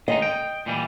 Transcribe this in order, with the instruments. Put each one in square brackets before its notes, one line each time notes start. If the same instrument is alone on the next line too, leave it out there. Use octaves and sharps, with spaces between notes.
[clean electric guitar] D#3 G#3 D#4 [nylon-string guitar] D#5
[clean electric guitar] G5
A#2 E3 G3